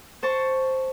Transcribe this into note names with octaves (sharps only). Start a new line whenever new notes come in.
C5 A5 C#6